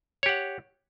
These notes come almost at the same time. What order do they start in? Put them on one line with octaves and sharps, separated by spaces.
C#5 G4 F#5